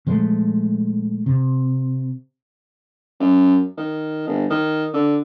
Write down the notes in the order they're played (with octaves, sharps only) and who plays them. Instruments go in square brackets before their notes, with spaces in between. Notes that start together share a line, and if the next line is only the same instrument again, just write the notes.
[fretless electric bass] A#2 F3 G#3 A3
C3
[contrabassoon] F#2
D#3
G1
D#3
D3